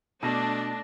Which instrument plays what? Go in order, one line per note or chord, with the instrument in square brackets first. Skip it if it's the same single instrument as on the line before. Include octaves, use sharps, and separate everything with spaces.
[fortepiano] B2 [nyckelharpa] A3 [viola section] D4 [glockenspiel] A5 A#6